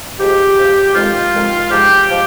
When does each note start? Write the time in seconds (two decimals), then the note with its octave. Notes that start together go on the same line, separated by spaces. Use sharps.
0.19 G#2 F3 G#3 G4
0.57 G#2 F3 G#3
0.94 F2 D#3 G#3 F4
1.32 F2 D#3 G#3
1.70 G#2 F3 G#3 G4
2.09 F3 G#3